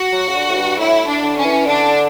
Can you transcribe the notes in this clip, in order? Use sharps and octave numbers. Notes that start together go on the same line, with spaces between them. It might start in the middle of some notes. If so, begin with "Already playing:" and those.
Already playing: F#4
F#3
C#3
D3
A2
G2
A2 E4
D4
D3
C#4
E3
D3 D4